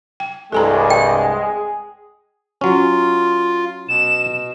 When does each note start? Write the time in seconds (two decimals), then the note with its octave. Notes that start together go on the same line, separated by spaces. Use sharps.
0.20 G5
0.52 C2 G2 G#3 A4 G#5 A#5
0.90 G5
1.45 G#4
2.61 F#3 C#4 F4
3.89 B2 E7